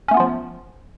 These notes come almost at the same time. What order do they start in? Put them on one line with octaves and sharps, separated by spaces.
C#4 A3 B3 F4 F3